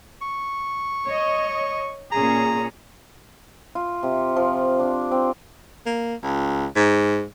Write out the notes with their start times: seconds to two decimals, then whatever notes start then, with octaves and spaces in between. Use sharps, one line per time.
0.22 C#6
1.07 C#5 D#5
2.12 A#2 C#4 G#4 A#5
3.75 F4
4.03 C3
4.36 F3
4.79 D4
5.11 C4
5.86 A#3
6.23 C#2
6.76 G#2